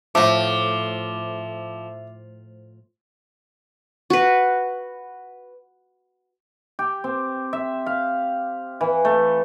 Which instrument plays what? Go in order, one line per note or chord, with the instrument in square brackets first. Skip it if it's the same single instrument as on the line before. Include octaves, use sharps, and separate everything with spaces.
[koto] A2 A3 [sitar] F3 [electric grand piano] E5 D6
[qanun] F#4 B4
[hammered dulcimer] G4
C4
E5
F5
E3
A3